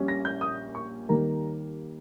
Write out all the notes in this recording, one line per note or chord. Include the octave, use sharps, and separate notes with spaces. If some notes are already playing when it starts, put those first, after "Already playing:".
Already playing: A#1 A#2 G3 C#4
A#6
G6
D#6
C#6
D#2 D#3 G3 A#3 A#5